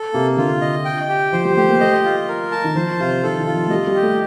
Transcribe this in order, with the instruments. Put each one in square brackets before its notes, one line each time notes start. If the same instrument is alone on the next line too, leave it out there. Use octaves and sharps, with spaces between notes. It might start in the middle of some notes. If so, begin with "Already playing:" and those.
Already playing: [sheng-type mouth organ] A4
[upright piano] C3 [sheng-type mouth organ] A#3
[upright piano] D3 [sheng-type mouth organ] F4
[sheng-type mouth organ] D#5
G5
G4
[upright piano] F3 [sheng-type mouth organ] C5
[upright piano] G3
[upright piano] A3 [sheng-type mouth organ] G4
[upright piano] A#3
[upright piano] A3 [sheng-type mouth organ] D#5
[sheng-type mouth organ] F4
A#4
A5
[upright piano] D#3
[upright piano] F3 [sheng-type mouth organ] C5
[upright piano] C3 [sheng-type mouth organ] F4
[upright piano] D#3 [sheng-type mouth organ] A4
[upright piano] D#3
[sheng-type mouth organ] F4
[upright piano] F3
A3
[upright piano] G3 [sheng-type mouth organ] D#5
[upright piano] G3
[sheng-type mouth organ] G4
[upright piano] A3